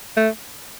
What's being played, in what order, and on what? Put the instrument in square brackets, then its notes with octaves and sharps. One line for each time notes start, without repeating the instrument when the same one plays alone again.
[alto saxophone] A3